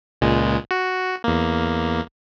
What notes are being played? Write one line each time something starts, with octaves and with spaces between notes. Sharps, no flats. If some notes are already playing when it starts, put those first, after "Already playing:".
C#2 A#2 G#3
F#4
E2 A#3